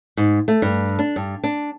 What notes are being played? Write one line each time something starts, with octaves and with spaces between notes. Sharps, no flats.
G#2
A3
G2
D4
G2
D4